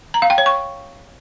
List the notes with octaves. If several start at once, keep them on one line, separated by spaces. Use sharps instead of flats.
A#5
F5
G5
C#5
C#6